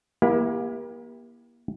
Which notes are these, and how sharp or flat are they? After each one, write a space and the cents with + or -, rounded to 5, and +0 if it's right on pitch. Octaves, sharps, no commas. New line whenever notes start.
A#3 +35 E4 +0 G4 +20